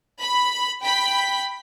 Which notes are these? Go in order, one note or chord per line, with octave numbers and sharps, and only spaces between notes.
B5
G5 B5 B6